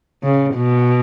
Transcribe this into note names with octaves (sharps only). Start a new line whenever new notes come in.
C#3
B2